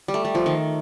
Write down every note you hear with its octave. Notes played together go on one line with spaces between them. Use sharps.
G3
A3
G3
F3
D#3